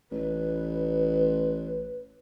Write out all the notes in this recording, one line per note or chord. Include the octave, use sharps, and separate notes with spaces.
A1 B4